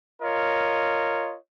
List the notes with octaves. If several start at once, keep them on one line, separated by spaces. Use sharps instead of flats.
F4 A#4 C#5 D#5